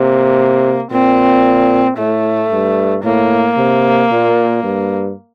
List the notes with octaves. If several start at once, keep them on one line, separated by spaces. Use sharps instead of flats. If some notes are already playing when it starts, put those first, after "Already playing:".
Already playing: C3 A#3
A#2 C4
A2 A3
G2
A2 A#3
C3
A#2
G2